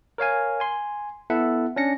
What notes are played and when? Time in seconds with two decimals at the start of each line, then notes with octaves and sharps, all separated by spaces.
0.18 A#4 C#5 F5 G#5
0.60 G#5 C6
1.30 B3 E4 A4 E5 F#5
1.76 C#4 D4 A#6 C#7